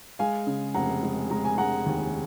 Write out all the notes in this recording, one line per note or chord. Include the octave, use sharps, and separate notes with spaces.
G#3 F5 G#5
C#3
F1 F#5 A#5
G#3
G#3 A#5
G#5
G#3 F#5 A#5
D#2